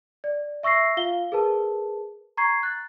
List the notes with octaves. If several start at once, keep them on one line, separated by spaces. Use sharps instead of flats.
D5
E5 C#6 E6 A#6 C7
F4 F5 G7
G#4 A#4 B4 A5
A#5 C#6 G#6 C7
F#6 A6